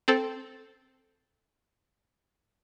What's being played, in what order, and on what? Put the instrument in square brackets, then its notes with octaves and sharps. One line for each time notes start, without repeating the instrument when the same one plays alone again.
[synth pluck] C4 A4